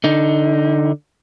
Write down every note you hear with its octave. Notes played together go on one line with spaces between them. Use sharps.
D3 D#4